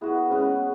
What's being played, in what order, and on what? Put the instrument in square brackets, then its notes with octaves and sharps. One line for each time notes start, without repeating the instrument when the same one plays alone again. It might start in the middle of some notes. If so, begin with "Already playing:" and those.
[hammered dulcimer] B3 F#4 B4 [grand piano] E4 G#4
[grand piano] G#3 C#4 [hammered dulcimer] B3 F#4 B4